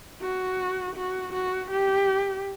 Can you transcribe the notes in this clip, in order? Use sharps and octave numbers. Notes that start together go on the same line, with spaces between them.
F#4
F#4
F#4
G4